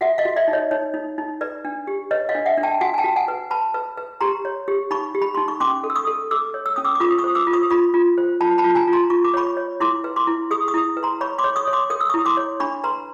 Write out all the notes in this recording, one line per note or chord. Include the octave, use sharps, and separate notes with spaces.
F#4 E5 F#5
D#5 F5
F#4
D5 E5
D#4
C#5 D#5
D#4 C#5
D#4
D#4
B4 D5
D4
G4
B4 C#5 D#5
D#5 F5
D4
E5 F#5
D4
G5 A5
F#4 F#5 G#5
G#5
G5 A5
F#4
F#5 G#5
B4
B4 A5 B5
B4
B4
G4 A#5 C6
C#5
G4
D#4 B5 C#6
G4
B5
D#4 C6
C#6
C#4 C6 D6
A4
E6
C#6 D#6
A4
A4 D6 E6
C#5
E6
C#4 D#6
D6 E6
D6
F4 C#6 D#6
C#6 D#6
C5
D6 E6
F4
C#6 D#6
F4 B5 C#6
F4
C5
F4 A5 B5
A5 B5
F4
G#5 A#5
F4
A#5 C6
F4 C#6
D6
C#5 B5 C#6
C#5
E4 C6 D6
B4
C6 D6
E4
G#4 C#6 D#6
C#6 D#6
E4
B4
A#5 C6
C#5 B5 C#6
C6 D6
C#5
C#6 D#6
C#5
C6 D6
A#4 D#6
E6
E4 C#6 D#6
C6 D6
C#5
D4 B5 C#6
B4 A#5 C6